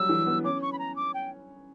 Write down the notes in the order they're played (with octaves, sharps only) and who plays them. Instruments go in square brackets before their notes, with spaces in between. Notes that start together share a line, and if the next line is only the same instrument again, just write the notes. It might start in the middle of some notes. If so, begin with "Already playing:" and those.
Already playing: [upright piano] F#3 G3 [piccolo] E6
[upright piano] E3
B3
[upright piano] C#4 [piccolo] D6
[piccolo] C#6
B5
A#5
D6
G5